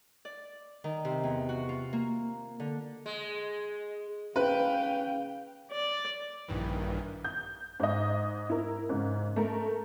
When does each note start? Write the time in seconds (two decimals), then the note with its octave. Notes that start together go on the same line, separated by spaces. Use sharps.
0.25 D5
0.84 D#3
1.05 C3
1.23 E2
1.49 F#4
1.69 F4
1.93 A#3
2.60 D3
3.06 G#3
4.36 C#3 B4 F5 G5
5.71 D5
6.48 A#1 G2 D#3 E3
7.24 G6
7.80 G#2 D#5
8.50 E4 A#4
8.89 G#2 C#3
9.36 A3 A#4